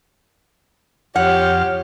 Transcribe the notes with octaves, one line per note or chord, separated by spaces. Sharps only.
F2 G4 C#5 F#5 F6